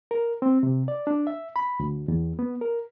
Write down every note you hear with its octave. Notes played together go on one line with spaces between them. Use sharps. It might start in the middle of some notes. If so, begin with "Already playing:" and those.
A#4
C4
C3
D5
D4
E5
B5
D2
E2
B3
A#4